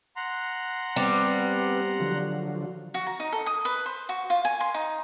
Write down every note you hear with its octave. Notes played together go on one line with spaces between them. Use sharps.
F#5 A#5 C6
G3 B3 C4
D3 F3 F#3
F#4
A#5
D#4
A4
D#6
B4
C5
F#4
F4
G#5
C6
D#4